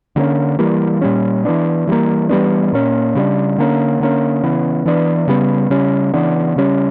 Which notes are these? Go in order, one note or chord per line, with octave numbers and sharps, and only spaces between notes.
D3 F#3 A#3 C#4
E3 G3 A#3
A#2 G3 C#4
E3 B3 D4
E3 G3 A#3
E3 G3 B3 D4
A#2 A#3 C#4
C#3 G3 B3 D4
D3 A#3 C#4
D3 A#3 C#4
C#3 E3 B3
E3 B3 D4
C#3 G3 B3
C#3 G3 C#4
C#3 E3 B3 D4
C#3 G3 C#4